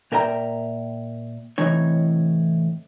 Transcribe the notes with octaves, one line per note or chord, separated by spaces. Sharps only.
A#2 A#4 E5 G5 A#5
A2 C3 E3 D#4 C#5